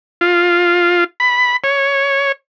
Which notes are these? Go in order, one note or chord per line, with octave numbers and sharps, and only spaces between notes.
F4
B5
C#5